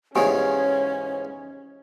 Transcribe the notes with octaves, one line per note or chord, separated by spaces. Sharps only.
E2 G#2 C#3 C#4 G4 C#5 G#5